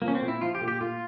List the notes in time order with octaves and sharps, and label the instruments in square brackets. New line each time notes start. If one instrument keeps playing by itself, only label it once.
[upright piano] F3 [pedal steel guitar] A#3
[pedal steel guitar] C#4
C4
[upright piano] A#2
[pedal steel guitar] E4
[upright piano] F3 [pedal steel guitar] F4
[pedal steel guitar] G4
[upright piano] A#2
[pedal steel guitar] G4
[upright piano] A#2 [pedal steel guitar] F4